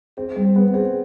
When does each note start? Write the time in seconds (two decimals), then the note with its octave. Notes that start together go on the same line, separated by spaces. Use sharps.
0.17 C4 G#4
0.36 G3 C4
0.55 B3 G#4
0.74 C4 G#4